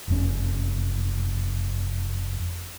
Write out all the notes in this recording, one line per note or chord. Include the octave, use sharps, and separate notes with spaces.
F#1 F2 C#4